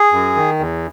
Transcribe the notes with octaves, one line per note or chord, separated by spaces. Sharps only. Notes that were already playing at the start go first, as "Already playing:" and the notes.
Already playing: G#4
F#2
D#3
E2